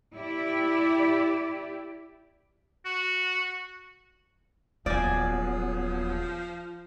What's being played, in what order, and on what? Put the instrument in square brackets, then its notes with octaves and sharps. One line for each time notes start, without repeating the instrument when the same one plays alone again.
[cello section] E4 G4 D5
[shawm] F#4
[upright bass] D#1 C#4 [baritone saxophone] F3 [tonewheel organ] F#3 B3 G#4 [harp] D5 G#5